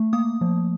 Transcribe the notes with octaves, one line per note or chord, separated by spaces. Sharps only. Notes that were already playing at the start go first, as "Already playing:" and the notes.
Already playing: A3
A#3 D#6
F3